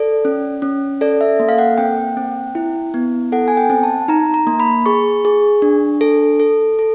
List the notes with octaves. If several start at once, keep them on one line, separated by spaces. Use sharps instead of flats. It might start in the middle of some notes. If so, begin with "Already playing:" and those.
Already playing: A4 D5
C#4
C#4
A4 D5
E5
A#3
F5
F#5
C4 G5
C4
E4
B3
A4 F#5
G#5
G5
C4
A5
D#4 A#5
A#5
A#3
B5
G#4 C#6
G#4
D4
A4
A4
A4